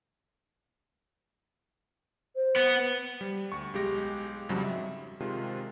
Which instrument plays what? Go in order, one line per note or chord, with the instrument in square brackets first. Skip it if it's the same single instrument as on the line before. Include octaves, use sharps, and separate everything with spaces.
[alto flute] C5
[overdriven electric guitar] B3
[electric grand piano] G3
D2 C#6
B1 G#3 G4 A#6
F2 G#2 C#3 F#3 G3
E5
C3 D#3 G#3 F4